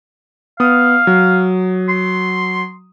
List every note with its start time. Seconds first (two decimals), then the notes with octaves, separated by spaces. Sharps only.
0.60 B3 F5 D#6
1.07 F#3
1.89 C6